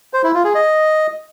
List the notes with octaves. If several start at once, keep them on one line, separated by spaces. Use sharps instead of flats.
C5
E4
F4
G#4
D#5